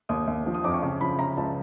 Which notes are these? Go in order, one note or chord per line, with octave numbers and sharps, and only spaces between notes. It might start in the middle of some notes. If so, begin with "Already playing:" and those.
D#2 D#6
D#2
F3
D#6
F2 D6
C#6
C#3
F3 B5
C#3 A#5
C#2 A5